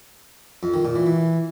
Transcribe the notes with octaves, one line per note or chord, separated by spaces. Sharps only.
F2
D#3
A#2
E3
E3